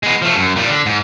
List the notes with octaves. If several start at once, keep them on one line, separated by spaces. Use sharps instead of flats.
G#3 B3
F3 A3
F#2
A#2 G3
D3
G#2